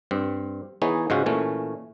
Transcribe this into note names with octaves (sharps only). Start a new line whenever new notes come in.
G2 C4
E3 B3 D#4 G#4 C#5
G#2 C#3 G#3 C#4 F4 F#4
A#2 E3 A3 C#4